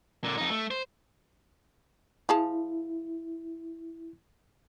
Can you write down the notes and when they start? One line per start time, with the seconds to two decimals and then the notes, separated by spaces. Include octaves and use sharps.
0.24 A#2 D3
0.38 F2 D#4
0.50 A3
0.71 C5
2.29 F3 E4 G#4 A5